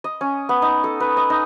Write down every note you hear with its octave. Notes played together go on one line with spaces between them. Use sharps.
D#5
C#4
B3
D#4
A4
B4
D#5
D#4